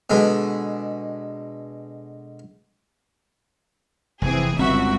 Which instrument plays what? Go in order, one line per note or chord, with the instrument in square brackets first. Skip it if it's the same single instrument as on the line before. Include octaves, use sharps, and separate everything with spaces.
[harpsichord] B2 D3 G#3 B3
[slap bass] F1 [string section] E3 C4 G#4
[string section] G1 C#2 E5 [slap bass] C4 [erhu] F#4